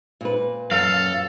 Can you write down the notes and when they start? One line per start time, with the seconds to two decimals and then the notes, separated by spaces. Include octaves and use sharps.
0.21 A#2 B4
0.71 F#2 A4 F5